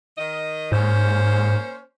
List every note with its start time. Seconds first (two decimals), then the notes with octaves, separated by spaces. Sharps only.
0.18 D#3 D#5
0.72 G#2 A#3 C#4 C5